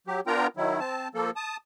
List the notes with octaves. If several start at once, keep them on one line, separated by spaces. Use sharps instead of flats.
F#3 G4
B3 D4 F4 A#4 G5 A#5
D#3 F#3 E4
C4 A5
F3 A#3 A4
A5 D#6